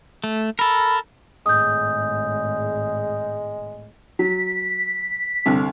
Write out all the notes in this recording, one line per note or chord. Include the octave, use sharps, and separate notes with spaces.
A3
A4 A#4 B5
G#1 A2 G#3 D#6 G6
F#3 B6
C2 D3